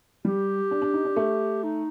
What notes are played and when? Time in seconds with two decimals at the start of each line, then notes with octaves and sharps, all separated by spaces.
0.25 G3 G4
0.71 D4
0.82 D4
0.94 D#4
1.05 D4
1.16 A3
1.63 D#4